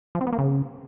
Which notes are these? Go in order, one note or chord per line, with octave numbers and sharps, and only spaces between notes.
F3
C4
B3
A#3
C#3